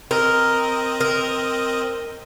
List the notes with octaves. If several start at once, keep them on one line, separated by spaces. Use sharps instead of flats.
C4 A#4 D#5
A#4